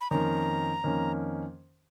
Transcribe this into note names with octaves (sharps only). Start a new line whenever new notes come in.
B5
F2 D#3 A#3 C#4 A#5
F2 D#3 A#3 C#4